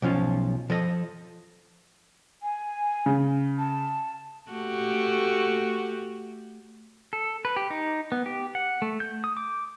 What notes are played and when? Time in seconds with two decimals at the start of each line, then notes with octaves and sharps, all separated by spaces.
0.02 B1 F3 C#4 F4
0.70 F3 A4 D#5
2.43 G#5
3.06 C#3
3.58 A5
4.51 A3 F#4 G4
7.13 A4
7.45 B4
7.56 G4
7.70 D#4
8.12 B3
8.26 G4
8.55 F#5
8.82 A3
9.00 G6
9.24 D#6
9.37 D6